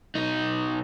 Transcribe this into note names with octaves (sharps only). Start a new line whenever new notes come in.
B1 D#4